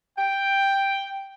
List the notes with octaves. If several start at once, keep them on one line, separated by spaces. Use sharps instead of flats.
G5